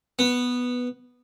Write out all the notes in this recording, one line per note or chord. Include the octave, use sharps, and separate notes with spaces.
B3